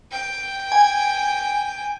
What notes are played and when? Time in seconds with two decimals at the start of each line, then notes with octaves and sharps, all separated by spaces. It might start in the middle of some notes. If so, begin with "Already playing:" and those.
0.12 G5
0.72 G#5